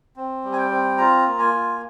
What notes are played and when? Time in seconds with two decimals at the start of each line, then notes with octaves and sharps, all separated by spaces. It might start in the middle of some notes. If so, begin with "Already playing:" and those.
0.16 C4
0.44 G3
0.52 G#5
0.58 G5
0.70 C4
0.98 F4 A#5
1.25 A#3
1.39 G#5
1.53 F4